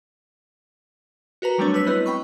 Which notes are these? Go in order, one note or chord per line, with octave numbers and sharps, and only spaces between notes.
F#4 A#4 B4 A#5
F#3 G3 A3 C4 D4 C#5
B3 B4 C#5 E6 B6
B3 C4 E4 B4 D#5
G5 B5 C#6